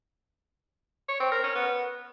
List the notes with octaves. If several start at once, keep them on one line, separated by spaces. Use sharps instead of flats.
C#5
C4
A#4
C#4
B3